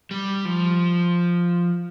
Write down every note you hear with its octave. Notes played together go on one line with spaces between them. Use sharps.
G3
F3